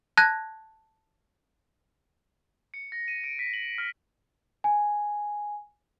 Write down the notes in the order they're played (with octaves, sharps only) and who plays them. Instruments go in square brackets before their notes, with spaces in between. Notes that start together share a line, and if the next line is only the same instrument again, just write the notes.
[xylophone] A5 F#6 G#6 A#6
[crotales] C#7
A#6
D#7
D7
B6
F#7
F6
[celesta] G#5